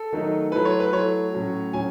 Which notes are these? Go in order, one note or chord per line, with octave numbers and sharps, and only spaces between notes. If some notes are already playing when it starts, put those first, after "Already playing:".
Already playing: A4
D#3 F#3 A3 D#4
F#3 A3 E4 B4
C#5
B4
F#3 A3 E4 C#5
A2 F#3 C#4
A2 F#3 C#4 G#5